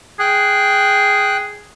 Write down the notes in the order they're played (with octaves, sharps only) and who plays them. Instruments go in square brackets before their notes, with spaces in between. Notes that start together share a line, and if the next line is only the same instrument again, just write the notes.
[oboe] G#4 [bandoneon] G5 F#6